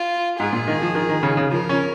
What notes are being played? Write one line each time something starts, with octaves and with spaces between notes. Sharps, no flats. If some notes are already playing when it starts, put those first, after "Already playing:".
Already playing: F4
G#2 G#4
A#2
D#3
F3
D#3
D#3
C#3
C#3
F3 A#4
C#4